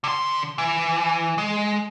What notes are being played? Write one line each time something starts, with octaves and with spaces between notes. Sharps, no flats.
D3 C6
E3
G#3